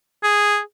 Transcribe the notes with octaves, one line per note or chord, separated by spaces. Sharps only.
G#4